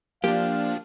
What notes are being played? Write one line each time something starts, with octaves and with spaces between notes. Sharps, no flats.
F3 A#3 D4 G4 F5